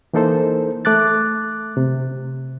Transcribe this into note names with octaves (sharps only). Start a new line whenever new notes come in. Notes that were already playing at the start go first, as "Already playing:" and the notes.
E3 A#3 D#4 A4 C5
A3 D6 F#6 A6
C3